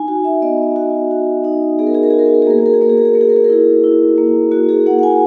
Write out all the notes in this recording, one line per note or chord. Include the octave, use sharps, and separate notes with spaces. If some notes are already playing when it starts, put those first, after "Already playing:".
Already playing: D#4 G#5
F#4
E5
B3 D#5
F#4
F#4
D#4
B3 G#4
A#4
G#4
A#4
G#4
F#4
A#4
G#4
A#4
G#4
A#3 A#4
G#4
A#4
G#4
A#3 A#4
G#4
A#4
G#4
A#3 A#4
G#4
A#4
G#4
A#4
E4 G#4
E4
A#3
A#3 F#4
G#4
A#3 F#5
F#5
G#5